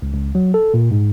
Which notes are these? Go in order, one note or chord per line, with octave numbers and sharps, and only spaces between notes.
C#2
C#2
F#3
A4
A#2
G#2